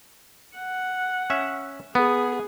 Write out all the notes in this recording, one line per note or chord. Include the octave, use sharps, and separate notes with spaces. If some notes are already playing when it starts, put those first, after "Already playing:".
F#5
C#4 E5
B3 G#4